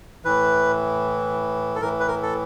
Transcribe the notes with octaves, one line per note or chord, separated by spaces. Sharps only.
A2 E3 B4
A4
A2 E3 A#4
B4
A#4
A4